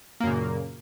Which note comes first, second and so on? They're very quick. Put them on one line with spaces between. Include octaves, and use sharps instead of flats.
A#3 F#2 C#3 A#2